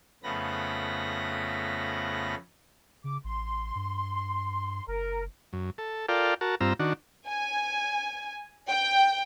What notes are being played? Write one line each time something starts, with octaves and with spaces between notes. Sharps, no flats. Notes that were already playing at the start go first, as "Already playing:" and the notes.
F2 C#3 A3 B3 B5 A#6
C#3 D6
A1 C6
G2
F#1 A#4
F#2
A4
F4 A4 A#4 D5 F5 G5
F#4 A#4 A5
G2 C4 F4 A#5 E6
D#3 D4 F#4
G#5
G5